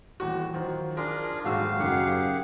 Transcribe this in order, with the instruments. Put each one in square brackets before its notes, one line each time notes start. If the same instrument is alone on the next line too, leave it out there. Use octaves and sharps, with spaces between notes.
[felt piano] D#1 E2 F#4
D#3 F3 F#3
[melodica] D4 F4 G#4 [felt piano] A#4
[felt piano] D#1 F#3 E6 [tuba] G#2 [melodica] F#4 [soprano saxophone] F5
[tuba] F#2 [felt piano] C#3 D#4 [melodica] G4 G#4 F#5